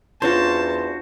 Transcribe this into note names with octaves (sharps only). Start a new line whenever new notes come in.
E2 C#4 D4 F4 F#4 C5 A5